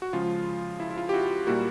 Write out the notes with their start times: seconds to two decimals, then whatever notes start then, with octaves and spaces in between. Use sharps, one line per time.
0.02 F#4
0.13 C#3 F3 G#3 F4
0.80 E4
0.91 E4
0.97 F4
1.09 G4
1.13 E4 F#4
1.47 A#2 G3 A#3 E4 F#4